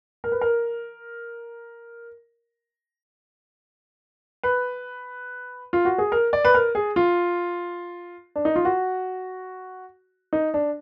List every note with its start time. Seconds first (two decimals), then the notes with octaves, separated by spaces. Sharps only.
0.24 A#4
0.32 B4
0.41 A#4
4.43 B4
5.73 F4
5.85 F#4
5.98 G#4
6.12 A#4
6.33 D5
6.45 B4
6.55 A#4
6.75 G#4
6.96 F4
8.36 D4
8.45 D#4
8.56 F4
8.65 F#4
10.33 D#4
10.54 D4